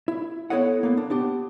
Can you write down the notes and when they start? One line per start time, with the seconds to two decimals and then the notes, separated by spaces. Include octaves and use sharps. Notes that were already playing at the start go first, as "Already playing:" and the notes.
0.08 E4
0.50 B3 E4 A4 C#5 D#5 F#5
0.83 A#3 B3
0.97 D4
1.10 B3 D4 G4